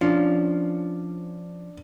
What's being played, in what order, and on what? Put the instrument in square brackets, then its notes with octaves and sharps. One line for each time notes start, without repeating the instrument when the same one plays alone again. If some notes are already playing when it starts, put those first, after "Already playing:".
[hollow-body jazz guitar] F3 C#4 F4 [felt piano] D4